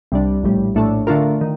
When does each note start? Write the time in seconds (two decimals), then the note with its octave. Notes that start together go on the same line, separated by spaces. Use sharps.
0.12 C2 C3 G3 D4
0.43 A#1 A2 G3
0.75 A#1 A2 A3 D4 A4
1.07 D3 A3 D4 F4 A#4
1.41 D#3